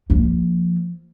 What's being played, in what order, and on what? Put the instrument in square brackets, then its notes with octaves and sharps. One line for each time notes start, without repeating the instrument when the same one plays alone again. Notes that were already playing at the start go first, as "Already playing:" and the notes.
[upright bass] F3 A#3